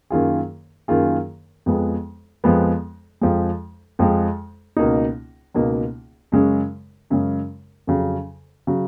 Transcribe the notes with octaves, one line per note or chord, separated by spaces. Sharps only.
F#2 D#3 A#3 F4 G#4
F#2 D#3 A#3 F4 G#4
F2 F3 G#3 B3
F2 F3 G#3 B3
F2 F3 G#3
F2 F3 G#3
C#2 B2 A#3 D#4
C#2 B2 A#3 D#4
F#2 C#3 G#3 C#4
F#2 C#3 G#3 C#4
F2 C#3 F#3
C#3 F#3